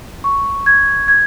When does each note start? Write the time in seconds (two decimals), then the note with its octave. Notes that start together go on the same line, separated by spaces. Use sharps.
0.24 C#6
0.66 G#6
1.08 G#6